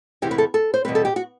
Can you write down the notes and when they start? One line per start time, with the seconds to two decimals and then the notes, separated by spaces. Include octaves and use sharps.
0.22 E2 C3 E3 G4
0.31 B4
0.38 A4
0.54 A4
0.74 C5
0.85 E2 B2 G3 C4 B4
0.95 A4
1.05 G4
1.16 F#4